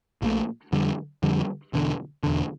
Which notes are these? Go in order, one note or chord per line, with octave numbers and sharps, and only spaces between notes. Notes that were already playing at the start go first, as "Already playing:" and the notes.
A#1 A#2 A3
F2 D3 G3
F2 D3 G3
E1 E2 D3
E1 E2 D3